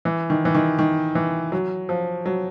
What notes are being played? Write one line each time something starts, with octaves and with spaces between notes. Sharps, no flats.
E3
D#3
E3
D#3
D#3
E3
F#3
F3
F#3